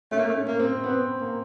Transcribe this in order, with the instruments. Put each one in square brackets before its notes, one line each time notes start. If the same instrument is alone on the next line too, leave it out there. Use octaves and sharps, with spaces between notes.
[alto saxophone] A3 [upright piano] C#4
[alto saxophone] A#3
A3
[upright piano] C#4
[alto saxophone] A#3
[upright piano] C4
[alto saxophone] B3 [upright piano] C4
[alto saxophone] A#3